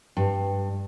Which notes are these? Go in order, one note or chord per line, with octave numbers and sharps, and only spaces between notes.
G2